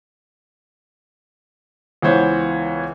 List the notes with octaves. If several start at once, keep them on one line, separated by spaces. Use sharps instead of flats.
C#2 E3 B3 C5 C#5 F#5